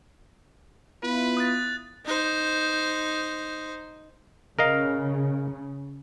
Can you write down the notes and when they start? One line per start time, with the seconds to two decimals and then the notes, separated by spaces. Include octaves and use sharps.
1.03 B3 E4 F4 B4
1.37 D#6 F#6 A6
2.06 D#4 C5
4.59 C#3 A#4 D#5 F5